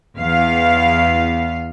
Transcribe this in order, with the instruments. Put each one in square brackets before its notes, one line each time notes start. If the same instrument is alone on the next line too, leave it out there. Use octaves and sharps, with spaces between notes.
[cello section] E2 B3 F5